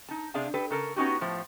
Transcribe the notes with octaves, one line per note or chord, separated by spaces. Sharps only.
D#4 A5
C3 D4 G#4 F5 A5
G4 A4 B4
C#3 A4 A#4
B3 C#4 D#4 F#4 G4
A2 F3 C5